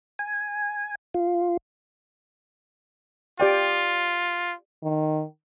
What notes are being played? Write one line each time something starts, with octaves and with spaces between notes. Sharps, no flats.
G#5
F4
F4 G4 D5 G5
D#3